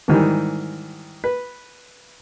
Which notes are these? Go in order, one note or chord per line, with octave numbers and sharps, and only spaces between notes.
G#2 D#3 E3 G3
B4